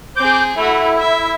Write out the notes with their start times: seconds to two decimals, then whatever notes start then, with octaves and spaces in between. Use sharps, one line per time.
0.17 C4 G#4 D6 G6
0.56 A3 E4 F#4
0.98 E5